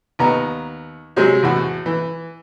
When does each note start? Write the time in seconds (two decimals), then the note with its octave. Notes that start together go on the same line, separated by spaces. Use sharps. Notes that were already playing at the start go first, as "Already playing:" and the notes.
0.19 D#2 B3 A#5
1.16 C3 F#3 G#3 C4
1.43 E2 A2 F#4
1.86 E3